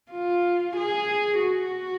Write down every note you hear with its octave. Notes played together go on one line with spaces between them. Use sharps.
F4
G#4
F#4